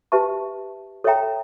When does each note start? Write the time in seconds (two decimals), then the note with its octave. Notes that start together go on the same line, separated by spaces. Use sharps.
0.12 G4 B4 E5 A5 C#6
1.04 A4 C#5 E5 G5 A#5